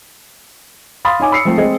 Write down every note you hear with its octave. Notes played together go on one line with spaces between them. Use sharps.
F5 B5 C6 D#6 A6
D#4 C#5 G#5 D6
B5 E6 C7 C#7
F3 A3 C4
G#3 C4 G#4 D#5